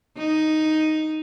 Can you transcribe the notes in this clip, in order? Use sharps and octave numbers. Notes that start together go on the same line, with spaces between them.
D#4